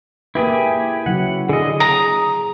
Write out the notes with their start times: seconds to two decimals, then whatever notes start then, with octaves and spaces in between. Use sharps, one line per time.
0.35 A#3 E4 G4 G#4 B4
1.06 C#3 F#3 E4 F#5
1.49 D3 G#4 D#5
1.80 A#5 D#6